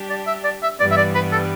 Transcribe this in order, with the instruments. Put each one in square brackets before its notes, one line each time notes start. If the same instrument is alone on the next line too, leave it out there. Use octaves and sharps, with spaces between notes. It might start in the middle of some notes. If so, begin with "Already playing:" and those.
Already playing: [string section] G3 D4 G4
[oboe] D5
E5
D5
E5
[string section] G2 E3 G3 B3 [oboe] D5
[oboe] E5
D5
B4
A4